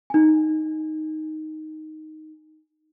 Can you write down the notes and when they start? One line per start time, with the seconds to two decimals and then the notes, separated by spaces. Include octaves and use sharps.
0.10 D#4 G#5